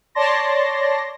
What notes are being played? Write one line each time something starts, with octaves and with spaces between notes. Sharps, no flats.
C#5 D5 A5 C6 A#6